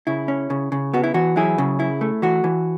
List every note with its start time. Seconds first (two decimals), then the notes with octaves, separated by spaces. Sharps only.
0.07 C#3 E4
0.28 C#4
0.50 C#3
0.72 C#3
0.94 B3 F#4
1.04 E4
1.14 E3 F#4
1.36 F#3 E4 G#4
1.58 C#3
1.80 E4
2.01 A3
2.22 E3 F#4
2.44 E3